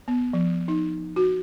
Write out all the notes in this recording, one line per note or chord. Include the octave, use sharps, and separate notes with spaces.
B3
F3
D#4
F#4